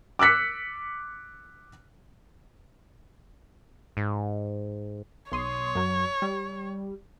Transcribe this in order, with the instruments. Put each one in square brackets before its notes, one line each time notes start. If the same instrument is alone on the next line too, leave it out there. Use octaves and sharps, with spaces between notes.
[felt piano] D6 E6 F#6 B6 C#7
[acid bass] G#2
[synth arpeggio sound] B1 C6 D#6 [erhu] C#5
[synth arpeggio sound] F#2 F#3
G3